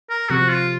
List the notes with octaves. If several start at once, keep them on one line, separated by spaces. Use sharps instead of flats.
A#4
C3 F3 C4 F#4
F4